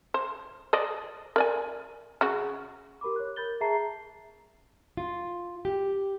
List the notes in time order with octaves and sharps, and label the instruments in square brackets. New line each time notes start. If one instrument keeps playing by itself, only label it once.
[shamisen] C5
C5 D5 D#5
A#4 D5 G#5
C#3 F#4
[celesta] G4 A#4 B5 D6
C#5 F#6
A#4 B5 G6 A6 G7
G#4 E5 A5 A#5 C7
[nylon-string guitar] F4
G4